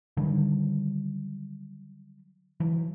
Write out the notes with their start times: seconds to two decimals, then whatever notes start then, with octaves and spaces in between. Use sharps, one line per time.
0.17 D3 D#3 F#3 G3
2.60 E3 F#3